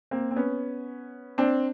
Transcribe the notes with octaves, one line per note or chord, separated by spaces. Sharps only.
A#3 C4
C4
B3 C#4
C4 D4